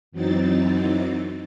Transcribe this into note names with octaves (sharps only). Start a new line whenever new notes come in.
F#2 E3 F#3 C4 D#4 A6